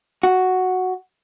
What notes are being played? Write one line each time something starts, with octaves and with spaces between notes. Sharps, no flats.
F#4